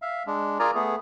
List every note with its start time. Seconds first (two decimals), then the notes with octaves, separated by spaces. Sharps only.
0.02 E5 F5
0.27 G#3 D4
0.59 F4 G#4 A#4 D5 G#5 A#5
0.75 A3 B3 G#4